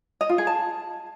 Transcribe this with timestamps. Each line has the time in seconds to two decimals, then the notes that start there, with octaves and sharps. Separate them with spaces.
0.21 D#5
0.29 F4
0.38 G#4
0.47 A5